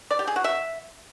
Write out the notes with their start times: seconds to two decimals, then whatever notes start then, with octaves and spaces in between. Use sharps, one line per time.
0.11 D5
0.19 G4
0.27 G#4
0.36 F#4
0.44 E5